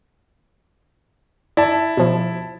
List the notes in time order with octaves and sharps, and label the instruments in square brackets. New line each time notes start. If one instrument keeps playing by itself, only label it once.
[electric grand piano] E4 A5 [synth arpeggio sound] D5
[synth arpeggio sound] B2 F3